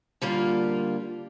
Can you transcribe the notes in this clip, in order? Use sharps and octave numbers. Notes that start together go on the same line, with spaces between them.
D3 G3 A#3 F4